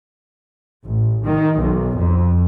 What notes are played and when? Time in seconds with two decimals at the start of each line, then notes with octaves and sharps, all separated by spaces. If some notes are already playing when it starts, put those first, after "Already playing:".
0.86 A1
1.25 D#3
1.59 B1
1.98 F2